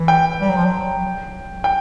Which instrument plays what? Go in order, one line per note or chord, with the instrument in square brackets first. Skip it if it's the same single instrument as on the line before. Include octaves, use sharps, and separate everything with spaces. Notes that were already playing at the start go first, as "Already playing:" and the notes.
Already playing: [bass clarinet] E3
[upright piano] G5
[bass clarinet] G3
F#3
F3
F#3
[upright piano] G5